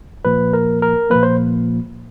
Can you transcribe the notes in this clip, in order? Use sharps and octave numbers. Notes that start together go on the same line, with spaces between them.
A#2 F3 A#3 B4
A#4
A#4
A#2 F3 A#3 B4
C5